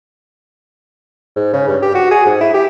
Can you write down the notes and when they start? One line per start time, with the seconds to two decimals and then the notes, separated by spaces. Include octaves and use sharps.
1.36 G#2
1.53 C#3
1.68 G2
1.82 G4
1.95 F#4
2.11 G#4
2.26 G#2
2.41 E4
2.54 G4